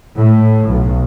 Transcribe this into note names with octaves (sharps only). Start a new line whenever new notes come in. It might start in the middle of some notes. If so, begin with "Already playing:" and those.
A2
B1